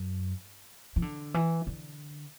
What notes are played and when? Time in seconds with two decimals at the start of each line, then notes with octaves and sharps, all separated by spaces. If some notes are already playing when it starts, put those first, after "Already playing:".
Already playing: F#2
0.96 E3
1.02 D3
1.34 E3
1.67 D3